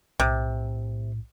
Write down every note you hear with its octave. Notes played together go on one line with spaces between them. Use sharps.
B1 A2 C3